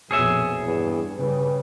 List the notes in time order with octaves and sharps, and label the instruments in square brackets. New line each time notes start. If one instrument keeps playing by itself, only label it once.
[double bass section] A#1 F2 B2 [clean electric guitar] G#4 C#5 E5
[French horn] E2 [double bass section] G2
[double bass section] C#3 G3 [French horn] B4